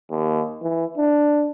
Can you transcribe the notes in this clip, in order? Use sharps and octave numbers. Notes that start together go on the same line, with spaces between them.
D#2
E3
D4